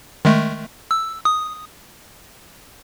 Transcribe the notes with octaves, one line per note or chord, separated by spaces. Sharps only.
D#3 G#3 A3
E6
D#6